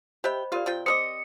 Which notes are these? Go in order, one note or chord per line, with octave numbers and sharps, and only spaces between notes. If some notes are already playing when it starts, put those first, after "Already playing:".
G4 C5 D#5 E5 G5 B5
F4 G4 A#4 D5 F5
C3 F4 G5
C4 A#4 D#5 D6 D#6 C#7